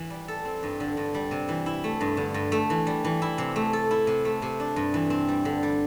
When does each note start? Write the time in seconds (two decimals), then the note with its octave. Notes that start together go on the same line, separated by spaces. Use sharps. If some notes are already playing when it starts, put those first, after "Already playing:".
Already playing: E3
0.10 G3
0.28 A4
0.45 C4
0.63 G2
0.80 D3
0.97 G2
1.15 G3
1.31 C3
1.48 E3
1.66 E4
1.84 A3
2.01 G2
2.17 D3
2.34 G2
2.52 A3
2.70 E3
2.87 G3
3.05 E3
3.22 E4
3.38 C3
3.56 A3
3.73 A4
3.91 E4
4.07 C3
4.25 A3
4.42 C3
4.60 D4
4.76 G2
4.94 E3
5.10 C4
5.29 G3
5.45 D3
5.63 G3